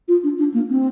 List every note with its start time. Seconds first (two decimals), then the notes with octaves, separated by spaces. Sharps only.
0.08 F4
0.24 D4
0.39 D4
0.54 A#3
0.69 C4